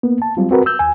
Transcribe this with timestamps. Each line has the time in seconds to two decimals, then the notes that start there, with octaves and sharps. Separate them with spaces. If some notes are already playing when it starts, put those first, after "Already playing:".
0.03 A#3 B3
0.22 A5
0.37 F#3 G3 C4 F4
0.51 C4 F#4 A#4 B4
0.66 E6 G6
0.79 D#2 G#5